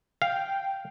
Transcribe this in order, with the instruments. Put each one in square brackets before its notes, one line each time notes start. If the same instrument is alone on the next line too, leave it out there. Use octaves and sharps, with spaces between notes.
[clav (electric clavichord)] F5 [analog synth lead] G5